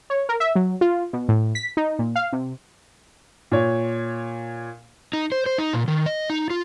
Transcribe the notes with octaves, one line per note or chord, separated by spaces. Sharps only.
C#5
A#4
E5
F#3
F4
B2
A2
B6
D#4
A#2
F5
C3
A#2 C#5
D#4
C5
C5
D#4
A#2
D#3
D#5
D#4
F4